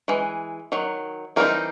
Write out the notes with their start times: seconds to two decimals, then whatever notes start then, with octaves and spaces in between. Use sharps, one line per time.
0.08 E3 G#3
0.72 D#3 F#3
1.36 E3 G3 C4 D#4 A#4